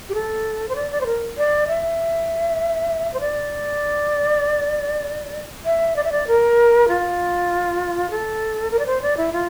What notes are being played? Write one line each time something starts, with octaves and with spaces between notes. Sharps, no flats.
G4
A4
C5
D5
D5
C5
A#4
D5
E5
C5
D5
E5
D5
E5
D5
A#4
F4
A4
A#4
D5
C5
D5
E4
F4